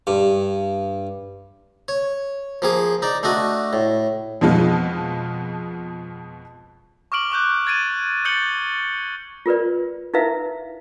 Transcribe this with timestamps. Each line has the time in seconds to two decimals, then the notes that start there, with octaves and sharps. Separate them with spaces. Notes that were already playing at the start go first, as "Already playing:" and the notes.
0.07 G2
1.88 C#5
2.62 F3 A#3 G#4
3.02 D#4 D5
3.23 A3 D4 F#4 D#5
3.73 A2
4.41 F2 B2 F3 G#3 B3 F4
7.12 C#6 D6 F6 D7 F#7
7.31 C#6 D6 F#6 G6
7.67 G#6 A6 D7 D#7
8.25 D#6 G6 A6 C#7 F#7 G7
9.46 F4 A#4 B4 D5
10.14 D#4 E4 A#4 B4 E5 F5